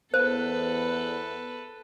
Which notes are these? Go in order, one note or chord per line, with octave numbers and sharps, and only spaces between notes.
E2 B3 A4 B4 C5